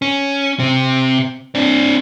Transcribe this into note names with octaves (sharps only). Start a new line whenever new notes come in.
C#4
C3 C4
C4 D4